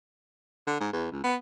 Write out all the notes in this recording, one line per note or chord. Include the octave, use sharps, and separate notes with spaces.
D3
G#2
E2
C#2
B3